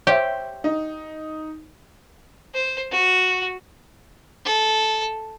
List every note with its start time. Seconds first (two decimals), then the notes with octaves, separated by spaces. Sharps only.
0.07 G4 C5 C#5 E5
0.64 D#4
2.54 C5
2.92 F#4
4.46 A4